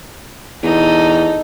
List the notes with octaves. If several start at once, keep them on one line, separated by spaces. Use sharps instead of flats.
E2 D#4 A4